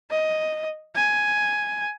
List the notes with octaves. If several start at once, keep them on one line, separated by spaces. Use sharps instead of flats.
D#5
G#5